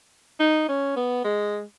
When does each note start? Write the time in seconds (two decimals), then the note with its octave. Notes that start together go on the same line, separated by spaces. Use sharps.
0.39 D#4
0.68 C#4
0.96 B3
1.24 G#3